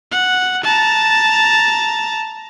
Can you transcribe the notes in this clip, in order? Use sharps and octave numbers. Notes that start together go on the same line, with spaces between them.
F#5
A5 A#5